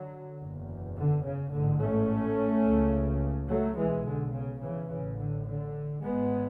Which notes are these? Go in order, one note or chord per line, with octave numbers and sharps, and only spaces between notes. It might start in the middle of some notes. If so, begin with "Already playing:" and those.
Already playing: D3 F#3
F#1 E2 B2
D3
C#3
A1 G#2 D3
A3 C#4
C#2 C#3
F#3 A3
B1 B2 E3 G#3
D3
C#3
C#3 E3
A1 A2 C#3
D3
D3
G#1 G#2 G#3 B3